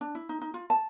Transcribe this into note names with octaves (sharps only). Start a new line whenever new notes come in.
D4
E4
D#4
D#4
F4
A5